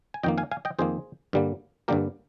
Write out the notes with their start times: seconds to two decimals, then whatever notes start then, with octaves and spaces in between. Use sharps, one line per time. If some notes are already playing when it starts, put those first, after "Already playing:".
0.14 G#5
0.23 F2 D#3 A#3 D#5 G5
0.38 F5 G#5
0.51 F5 G#5
0.65 D#5 G5
0.79 F2 D#3 A#3 G#4 C5
1.33 G2 D3 G3 A#3
1.88 G2 D3 G3 A#3 G4 A#4